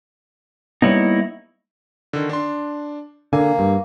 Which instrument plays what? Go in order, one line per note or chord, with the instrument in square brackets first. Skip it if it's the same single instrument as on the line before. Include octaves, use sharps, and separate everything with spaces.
[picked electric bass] G3 A#3 B3 [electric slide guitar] D#4 E4 C#5
[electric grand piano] D3 D#3
D4 C6
[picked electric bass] D3 [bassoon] A#3 [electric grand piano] G#5
[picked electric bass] G2